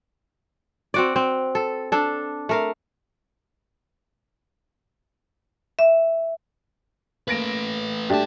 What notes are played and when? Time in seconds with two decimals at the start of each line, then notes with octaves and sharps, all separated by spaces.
0.94 C4 F#4 D5
1.16 C4
1.55 A4
1.92 D4 A4
2.49 A3 A#4 F5
5.79 E5
7.28 A3 A#3 B4 A#6 D7
8.10 G2 A3 D4 G4 A5